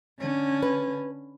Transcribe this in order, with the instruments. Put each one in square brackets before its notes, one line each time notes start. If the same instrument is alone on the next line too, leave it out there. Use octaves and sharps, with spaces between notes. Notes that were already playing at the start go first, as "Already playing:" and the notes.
[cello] D3 C#4
[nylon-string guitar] B4